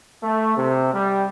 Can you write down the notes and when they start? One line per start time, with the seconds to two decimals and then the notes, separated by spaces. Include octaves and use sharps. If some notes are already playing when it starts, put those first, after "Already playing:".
0.22 A3
0.56 C3
0.93 G3